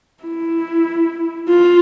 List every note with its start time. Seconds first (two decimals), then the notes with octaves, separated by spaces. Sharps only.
0.23 E4
1.48 F4